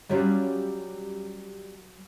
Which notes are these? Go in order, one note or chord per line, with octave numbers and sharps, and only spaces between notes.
F#3 G3 C#4 F4